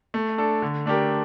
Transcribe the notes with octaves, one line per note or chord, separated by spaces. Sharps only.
A3
D4 A4
D3
A3 D4 G4 A#4